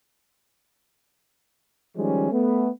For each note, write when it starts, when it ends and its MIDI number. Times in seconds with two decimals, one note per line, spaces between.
1.97 2.28 51
1.97 2.28 53
1.97 2.28 55
1.97 2.28 56
1.97 2.28 61
2.31 2.69 57
2.31 2.69 59